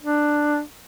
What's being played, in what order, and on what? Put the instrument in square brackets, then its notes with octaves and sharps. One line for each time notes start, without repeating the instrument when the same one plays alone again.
[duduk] D4